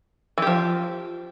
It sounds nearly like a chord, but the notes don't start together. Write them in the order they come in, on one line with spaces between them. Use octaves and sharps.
E3 G4 F3